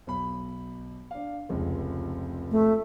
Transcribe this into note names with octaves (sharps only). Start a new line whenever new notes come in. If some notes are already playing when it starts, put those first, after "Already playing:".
B1 B5
D4 F5
F1 C#2
A3